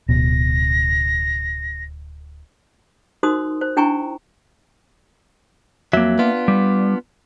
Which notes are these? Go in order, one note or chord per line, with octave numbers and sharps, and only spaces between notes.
D1 B2 A#6
D#4 F#4 A#4 C5 C6 D#6
C5
D4 E4 G5 G#5 A#5 C#6
F2 F#3 A#3 E5
B3 D4 F4
G3